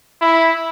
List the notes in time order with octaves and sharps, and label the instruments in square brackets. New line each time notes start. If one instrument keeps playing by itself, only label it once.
[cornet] E4